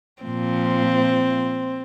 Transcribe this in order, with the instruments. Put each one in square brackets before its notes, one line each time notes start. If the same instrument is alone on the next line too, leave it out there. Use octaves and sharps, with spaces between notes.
[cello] A#2 F3 [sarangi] C4